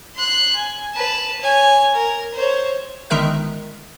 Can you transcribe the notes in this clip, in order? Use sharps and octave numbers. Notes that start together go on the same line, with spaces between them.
C6 F#6
G#5
B4 A5
C#5 G#5
A#4
C5 C#5
G1 D#3 G#3 A#4 E5 F#6